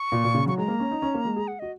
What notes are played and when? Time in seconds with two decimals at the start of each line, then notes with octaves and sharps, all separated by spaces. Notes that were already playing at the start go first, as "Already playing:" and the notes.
Already playing: C#6
0.12 A#2
0.24 A#2
0.35 C#3
0.46 F#3 C#6
0.58 G#3 A#5
0.68 A#3
0.80 C#4
0.91 D#4
1.02 C#4
1.14 A#3
1.25 G#3
1.36 G#4
1.48 F#5
1.59 F#4 D#5